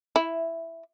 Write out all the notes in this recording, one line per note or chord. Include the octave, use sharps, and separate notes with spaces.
E4